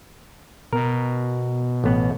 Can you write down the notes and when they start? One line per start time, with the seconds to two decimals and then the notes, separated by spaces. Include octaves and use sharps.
0.73 B2 A#4
1.84 A1 B3 F#5